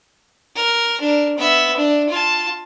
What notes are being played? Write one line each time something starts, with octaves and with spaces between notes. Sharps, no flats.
A#4
D4 A#4
B3 E5
D4
F4 A5